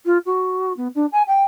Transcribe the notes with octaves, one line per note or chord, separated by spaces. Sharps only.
F4
F#4
B3
D4
G#5
G5